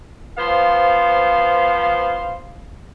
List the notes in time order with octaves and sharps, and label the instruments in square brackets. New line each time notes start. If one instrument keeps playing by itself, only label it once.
[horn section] F3 B3 C5 F5